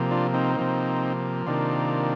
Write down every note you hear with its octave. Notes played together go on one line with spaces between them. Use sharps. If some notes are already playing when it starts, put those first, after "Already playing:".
Already playing: C3 F3 A#3
D4 F4
C4 D#4
C3 F3 A#3
C3 D#3 A#3 D4 F4